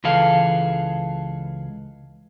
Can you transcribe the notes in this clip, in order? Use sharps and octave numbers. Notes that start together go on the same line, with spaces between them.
C#2 E3 G#4 A4 F5